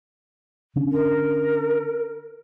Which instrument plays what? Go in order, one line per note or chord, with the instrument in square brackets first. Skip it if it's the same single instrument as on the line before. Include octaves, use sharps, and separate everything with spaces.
[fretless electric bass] D3 C#4 D4
[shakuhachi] A#4